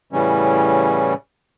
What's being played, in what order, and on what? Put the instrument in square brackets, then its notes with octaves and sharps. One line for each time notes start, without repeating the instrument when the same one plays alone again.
[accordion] A2 C#3 E3 G3 C#4